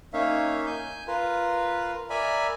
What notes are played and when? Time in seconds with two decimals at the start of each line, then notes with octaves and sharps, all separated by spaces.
0.13 A#3 C#4 D#4 C#5 E5 F5
0.66 G#5 G6
1.08 F4 A#4 B4
2.10 A#4 D5 E5 G#5 B5